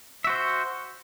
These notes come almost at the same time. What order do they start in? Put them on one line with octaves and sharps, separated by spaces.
E5 F#4 C5